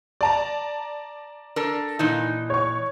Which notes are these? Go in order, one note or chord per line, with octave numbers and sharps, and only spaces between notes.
D5 A5 A#5
D4 A4 A#4
A#2 E3 D#4
C#5 C#6